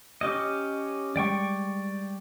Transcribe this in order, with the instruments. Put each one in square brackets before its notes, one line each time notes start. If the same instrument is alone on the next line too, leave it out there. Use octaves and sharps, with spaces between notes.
[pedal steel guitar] C#4 G4 D#5
[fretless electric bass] G3 G#3 [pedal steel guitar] D5 G5 C#6